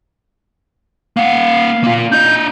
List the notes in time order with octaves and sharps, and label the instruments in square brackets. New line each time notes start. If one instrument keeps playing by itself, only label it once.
[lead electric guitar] A#3 F#5 [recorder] F5
[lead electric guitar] A#3 F4
[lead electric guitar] D4 D#5 [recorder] G6